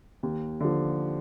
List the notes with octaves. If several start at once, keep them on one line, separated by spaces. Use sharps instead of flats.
D#2
D3 F3